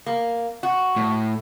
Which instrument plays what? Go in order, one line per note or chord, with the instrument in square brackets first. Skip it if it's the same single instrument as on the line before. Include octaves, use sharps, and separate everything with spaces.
[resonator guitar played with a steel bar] A#3
F#4
[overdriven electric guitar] A2